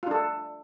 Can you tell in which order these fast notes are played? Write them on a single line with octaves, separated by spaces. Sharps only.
F4 D4 A4